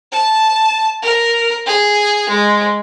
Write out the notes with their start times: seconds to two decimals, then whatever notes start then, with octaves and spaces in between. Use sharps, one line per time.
0.12 A5
1.02 A#4
1.66 G#4
2.30 G#3